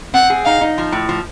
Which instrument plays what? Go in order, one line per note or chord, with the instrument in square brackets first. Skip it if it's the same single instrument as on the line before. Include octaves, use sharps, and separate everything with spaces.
[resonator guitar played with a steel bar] C4 [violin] F#5
[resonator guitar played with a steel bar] G#4
[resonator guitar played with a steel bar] D#4 [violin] F5
[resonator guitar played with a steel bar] D#4
F3
A2
F3